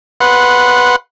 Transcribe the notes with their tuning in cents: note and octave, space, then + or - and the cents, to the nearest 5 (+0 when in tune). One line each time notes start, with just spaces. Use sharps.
B4 +0 F#5 -10 C6 +0